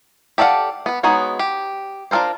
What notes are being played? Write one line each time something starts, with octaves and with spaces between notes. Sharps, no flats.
G4 A4 D5 F5 F#5
B3 B4
G#3 B3 D#4 F#4 C#5
G4
D4 F4 A4 A#4 C5